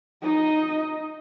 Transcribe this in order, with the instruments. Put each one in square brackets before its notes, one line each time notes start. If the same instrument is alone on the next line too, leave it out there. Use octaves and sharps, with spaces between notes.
[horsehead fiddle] D#4 D#5